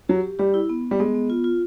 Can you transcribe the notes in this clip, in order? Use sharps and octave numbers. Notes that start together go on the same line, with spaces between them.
F#3 G4
G4
G3 G4
E4
B3
B3
G3
G#3 B3
B3
F4
F4